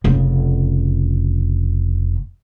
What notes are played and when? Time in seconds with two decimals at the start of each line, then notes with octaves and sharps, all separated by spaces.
0.04 F1 C#3